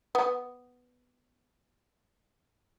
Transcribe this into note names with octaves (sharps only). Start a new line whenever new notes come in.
B3